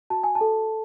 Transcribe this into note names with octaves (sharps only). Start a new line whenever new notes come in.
F#4 A5
G#5
A5
A4